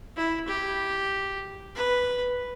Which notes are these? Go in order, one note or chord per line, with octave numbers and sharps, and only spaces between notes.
E4
G4
B4